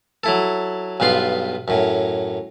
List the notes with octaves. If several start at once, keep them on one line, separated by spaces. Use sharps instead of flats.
F#3 E4 A4
B1 G2 B3 F4 C6
F#2 A2